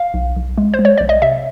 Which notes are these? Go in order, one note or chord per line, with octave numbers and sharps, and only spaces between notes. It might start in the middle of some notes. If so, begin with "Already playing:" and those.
Already playing: F5
B1
B1
G#3
C5
G#3
C#5
B1 D5
D#5
C3 E5